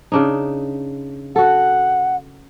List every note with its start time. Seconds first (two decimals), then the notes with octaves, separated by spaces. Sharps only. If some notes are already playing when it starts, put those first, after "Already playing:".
0.12 C#3 D4 D#4
1.36 F#4 A4 F#5